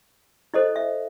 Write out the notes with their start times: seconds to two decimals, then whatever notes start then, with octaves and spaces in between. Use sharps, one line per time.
0.54 E4 A4 C5 D#5
0.76 E5